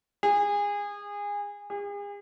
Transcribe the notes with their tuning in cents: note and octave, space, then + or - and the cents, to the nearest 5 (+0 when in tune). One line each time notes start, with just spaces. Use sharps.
G#4 -25
G#4 -40